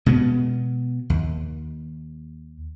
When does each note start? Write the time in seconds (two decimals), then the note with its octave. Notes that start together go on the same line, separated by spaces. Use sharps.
0.06 B2 G#3 B3
1.10 D#2